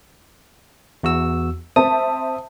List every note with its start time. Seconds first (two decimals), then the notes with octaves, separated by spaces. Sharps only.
1.03 E2 F#4 E6
1.76 C4 E5 A5 D#6